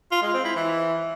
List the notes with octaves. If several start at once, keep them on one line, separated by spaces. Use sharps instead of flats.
F4
G#3
C4
E4
E3